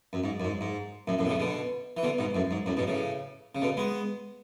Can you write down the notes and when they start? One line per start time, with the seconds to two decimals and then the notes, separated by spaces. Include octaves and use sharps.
0.13 F#2
0.24 G#2
0.40 F#2
0.45 G#2
0.61 G#2
1.08 F#2 A2
1.19 F#2 A2
1.25 B2
1.29 A2 C#3
1.40 B2 D3
1.97 E3
2.03 B2 D3
2.18 G#2 B2
2.35 F#2 A2
2.51 G#2
2.66 F#2 A2
2.77 G#2 B2
2.87 A2 C#3
3.55 C#3
3.62 B2 D3
3.77 G#3 B3